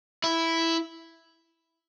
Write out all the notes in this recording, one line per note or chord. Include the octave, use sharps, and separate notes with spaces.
E4